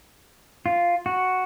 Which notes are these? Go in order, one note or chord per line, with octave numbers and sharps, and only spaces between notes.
F4
F#4